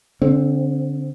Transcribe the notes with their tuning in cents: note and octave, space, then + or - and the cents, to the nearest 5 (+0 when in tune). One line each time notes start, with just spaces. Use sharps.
D3 -25 C4 +5